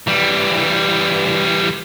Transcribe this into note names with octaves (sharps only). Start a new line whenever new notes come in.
E3 G3